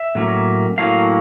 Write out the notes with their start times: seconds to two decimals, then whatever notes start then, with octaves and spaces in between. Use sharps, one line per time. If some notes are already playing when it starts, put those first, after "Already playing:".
Already playing: E5
0.15 A2 F#3 A#3 C#4
0.78 A2 F#3 A#3 C#4 F5